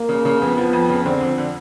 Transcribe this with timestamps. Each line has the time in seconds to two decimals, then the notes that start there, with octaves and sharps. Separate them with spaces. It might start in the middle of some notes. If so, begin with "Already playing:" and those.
Already playing: A#3
0.09 C#3
0.25 C#3
0.42 F2 B3
0.58 F3
0.73 F2
0.89 C#3
1.05 D3 C4
1.21 F2
1.38 D3